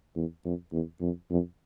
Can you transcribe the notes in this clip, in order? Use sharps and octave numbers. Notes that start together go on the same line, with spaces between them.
E2
F2
E2
F2
F2